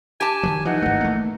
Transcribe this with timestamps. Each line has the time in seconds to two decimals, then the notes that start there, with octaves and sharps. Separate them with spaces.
0.21 G4 G#5 A5
0.43 D#3 E3 F#3
0.65 E3 F3 D#4 F#5
0.82 G#1 A3
1.01 A3 A#3